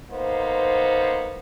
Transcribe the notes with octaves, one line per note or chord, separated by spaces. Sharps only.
A#3 B3 D#4 C5